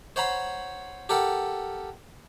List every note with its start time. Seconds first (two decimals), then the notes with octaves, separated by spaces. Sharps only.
0.16 C5 C#5 F#5 A#5 B5
1.09 G4 A4 A#4 F#5